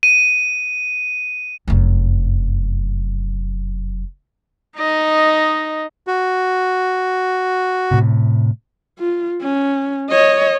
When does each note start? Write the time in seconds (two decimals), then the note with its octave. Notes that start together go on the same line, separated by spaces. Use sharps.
0.03 D#7
1.68 F1 F#2
4.78 D#4 D#5
6.07 F#4
7.91 A2 C3
8.99 F4
9.42 C#4
10.10 C#5 D#5